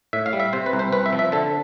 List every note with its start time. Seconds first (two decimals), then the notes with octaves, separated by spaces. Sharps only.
0.13 A2 E5
0.26 F5
0.33 G3
0.40 E5
0.53 C3 C5
0.66 B4
0.73 C2
0.79 C5
0.92 C2 B4
1.06 E5
1.13 F3
1.19 E5
1.32 D3 A4